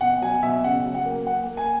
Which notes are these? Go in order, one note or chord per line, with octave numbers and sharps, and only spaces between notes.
B2 F#5
F#3 G#5
B2 E5
C#3 F#5
F#3
F#5
A#3
A#3 F#5
A#3
G#5